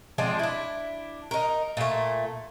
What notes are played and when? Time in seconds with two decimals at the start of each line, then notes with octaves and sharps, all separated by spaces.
0.18 F3 G#3 C4 D4
0.39 D4 E4
1.31 D#4 A#4
1.77 A#2 A3